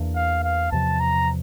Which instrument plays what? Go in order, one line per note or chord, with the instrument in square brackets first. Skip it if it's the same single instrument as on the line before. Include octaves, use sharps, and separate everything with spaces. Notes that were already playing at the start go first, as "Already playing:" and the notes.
Already playing: [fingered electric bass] E2 E3 A#3 D4
[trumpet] F5
F5
[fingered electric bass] E2 C3 F3 [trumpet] A5
[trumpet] A#5